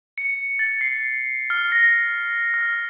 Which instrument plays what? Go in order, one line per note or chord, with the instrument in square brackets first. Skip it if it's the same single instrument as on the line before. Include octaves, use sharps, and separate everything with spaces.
[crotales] C#7
A6
C7
F6
A#6
F6